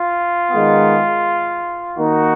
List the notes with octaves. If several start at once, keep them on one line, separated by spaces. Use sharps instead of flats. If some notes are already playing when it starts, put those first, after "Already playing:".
Already playing: F4
D#3 G#3 B3
D#3 A#3 D#4 F#4